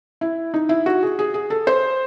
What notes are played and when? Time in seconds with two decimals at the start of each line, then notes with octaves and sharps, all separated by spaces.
0.21 E4
0.54 D#4
0.69 E4
0.86 F#4
1.03 G#4
1.19 G#4
1.34 G#4
1.50 A4
1.67 C5